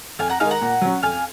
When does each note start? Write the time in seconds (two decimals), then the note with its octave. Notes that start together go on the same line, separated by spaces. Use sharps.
0.19 F2 F5 G#5
0.30 F#5 A#5
0.40 D#3 G#3 D#4 F5 G#5
0.51 F#5 A#5
0.61 A#2
0.82 F#3 C#4
1.03 F2 F5 G#5